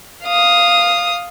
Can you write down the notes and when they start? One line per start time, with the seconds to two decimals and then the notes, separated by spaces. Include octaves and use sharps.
0.25 F5 D#6